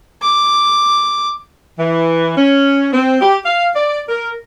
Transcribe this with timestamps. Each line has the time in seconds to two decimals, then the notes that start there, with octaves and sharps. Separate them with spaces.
0.22 D6
1.79 E3
2.37 C#4
2.93 C4
3.21 G4
3.46 F5
3.76 D5
4.09 A#4